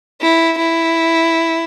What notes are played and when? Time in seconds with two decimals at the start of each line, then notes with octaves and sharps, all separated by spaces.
0.22 E4
0.58 E4